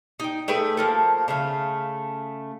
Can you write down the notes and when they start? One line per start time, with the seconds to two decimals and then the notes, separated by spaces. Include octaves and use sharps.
0.20 D#4 G5
0.48 A3 G#4 B4 G5
0.77 F3 A#3 A4
1.28 C#3 A3 F5